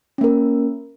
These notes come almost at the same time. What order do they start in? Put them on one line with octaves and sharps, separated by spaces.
C#4 A#3 A#4